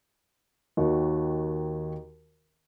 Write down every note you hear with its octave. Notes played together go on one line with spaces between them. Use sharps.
D#2 D#3 F#4